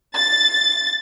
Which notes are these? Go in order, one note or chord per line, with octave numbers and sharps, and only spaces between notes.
A6